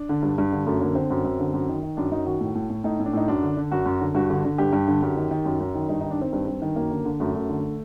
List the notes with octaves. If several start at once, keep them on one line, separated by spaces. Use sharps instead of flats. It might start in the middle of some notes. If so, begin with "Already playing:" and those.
Already playing: D4
D3
G2
G2
D3
F#2 A3
D3 A#3
D3 C4
F#2
F#2
D3
F#2
D#3
D#3
F#2 D4
F#2 D#4
D#3 F#4
A2
A2
A2
A2 D#4
A2
D4
A2 D#4
F#2 D4
D3
D3
F#2 F#4
F#2
D3
G2 F#4
D3
D3
G2 G4
G2
D3
F#2
D#3
D#3
F#2
F#2
D#3
G2 D#4
D#4
D#3
D4
D#3 C4
G2
G2
D#3
F#2 A#3
D3
D3
F#2 A3
F#2
D3